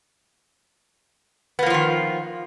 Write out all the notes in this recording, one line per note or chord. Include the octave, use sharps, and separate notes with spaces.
D#3 F3 A#3 B3 F4